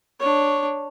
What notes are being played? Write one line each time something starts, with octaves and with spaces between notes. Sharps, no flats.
D4 C#5